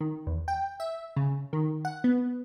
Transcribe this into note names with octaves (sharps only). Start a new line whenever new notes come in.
D#3
E2
G5
E5
C#3
D#3
F#5
B3